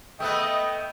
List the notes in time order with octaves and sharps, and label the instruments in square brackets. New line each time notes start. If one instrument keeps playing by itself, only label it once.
[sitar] A3 B3 B4 [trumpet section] D#5 [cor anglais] G5